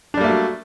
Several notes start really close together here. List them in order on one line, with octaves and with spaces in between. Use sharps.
D4 G3 A#3 A3 F#3